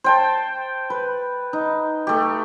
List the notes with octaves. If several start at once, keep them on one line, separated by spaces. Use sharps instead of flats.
C5 G5 A5
B4
D#4
A3 G4